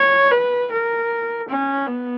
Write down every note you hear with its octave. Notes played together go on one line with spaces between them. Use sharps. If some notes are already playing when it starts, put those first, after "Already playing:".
Already playing: C#5
B4
A#4
C#4
B3